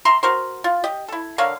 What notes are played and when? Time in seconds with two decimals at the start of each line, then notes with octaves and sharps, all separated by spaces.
0.05 E5 A#5 C6
0.23 F#4 A#4 C5
0.64 F4
0.84 G4 D#5
1.08 E4 A4
1.38 D3 A#4 C#5 F5